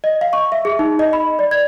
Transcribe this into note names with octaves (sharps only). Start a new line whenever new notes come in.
D#5
F5
C#6
E5
G#4
D#4
D#5
B5
D5
G#6